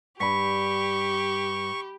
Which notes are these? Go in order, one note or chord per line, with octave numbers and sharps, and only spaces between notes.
G2 G4 B5 C#6 B6